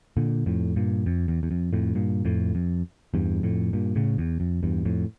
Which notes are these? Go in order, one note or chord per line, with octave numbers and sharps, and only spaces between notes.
A#2 D3
F2 A2
G2 A#2
F2
E2
E2
F2
F2 A2
G2 A#2
F2 A2
F2
E2 G2
F2 A2
G2 A#2
A2 C#3
E2
F2
E2 G2
F2 A2